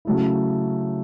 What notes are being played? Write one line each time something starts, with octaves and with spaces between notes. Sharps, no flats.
C#3 F#3 A3 E4